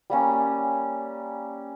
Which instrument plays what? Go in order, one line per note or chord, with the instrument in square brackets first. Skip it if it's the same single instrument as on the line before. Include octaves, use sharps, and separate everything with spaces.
[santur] G3 A#3 C#4